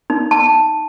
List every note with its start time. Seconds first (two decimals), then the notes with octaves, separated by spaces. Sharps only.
0.10 D#4
0.31 A5